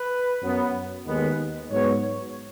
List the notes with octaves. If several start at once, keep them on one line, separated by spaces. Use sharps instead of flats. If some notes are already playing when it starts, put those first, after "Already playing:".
Already playing: B4
F#2 F#3 B3
D#2 D#3 G#3 B3
G#2 F#3 B3 C#5